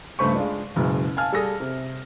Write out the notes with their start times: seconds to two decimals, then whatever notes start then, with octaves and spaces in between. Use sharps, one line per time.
0.19 C#2 G2 A3 C5 B5 C#6
0.34 G#3 D4 F4
0.76 F#1 B2 G#3
1.17 F5 G#5 A5 F6
1.32 G3 G#4 A4 G#5 D#6 A#6
1.60 C3